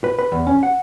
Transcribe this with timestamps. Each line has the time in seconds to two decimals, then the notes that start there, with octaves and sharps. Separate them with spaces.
0.04 B4
0.19 B4
0.32 E2
0.47 C#4
0.63 F#5